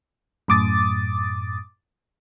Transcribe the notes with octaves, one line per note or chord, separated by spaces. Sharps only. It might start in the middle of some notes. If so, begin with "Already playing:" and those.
F#2 A2 D6 D#6 A6